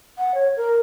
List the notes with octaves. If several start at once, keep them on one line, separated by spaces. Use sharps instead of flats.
F#5
C#5
A#4